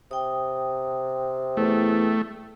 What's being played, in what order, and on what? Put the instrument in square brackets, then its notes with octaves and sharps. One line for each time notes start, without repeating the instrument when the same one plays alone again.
[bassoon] C3 [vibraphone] G5 D#6
[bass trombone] E2 [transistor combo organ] A3